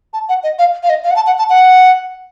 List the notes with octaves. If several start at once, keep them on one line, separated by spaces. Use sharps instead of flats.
A5
F#5
D#5
F5
F5
D#5
F5
F#5
A5
F#5
A5
F#5